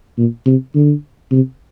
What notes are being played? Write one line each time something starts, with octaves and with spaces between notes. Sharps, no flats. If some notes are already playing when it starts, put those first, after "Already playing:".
A#2
C3
D3
C3